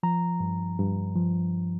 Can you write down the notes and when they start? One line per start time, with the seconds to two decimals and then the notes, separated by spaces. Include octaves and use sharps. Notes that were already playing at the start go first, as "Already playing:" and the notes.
0.03 F3 A#5
0.40 G2
0.78 G2
1.16 F3